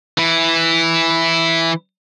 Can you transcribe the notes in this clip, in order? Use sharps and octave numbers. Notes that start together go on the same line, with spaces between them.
E3 E4